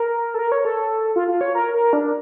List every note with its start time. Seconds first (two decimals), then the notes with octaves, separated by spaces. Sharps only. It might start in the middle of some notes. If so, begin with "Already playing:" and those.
Already playing: A#4
0.34 A4
0.39 A#4
0.52 C#5
0.65 A4
1.16 F4
1.28 F4
1.41 C#5
1.55 A#4
1.74 A#4
1.93 D4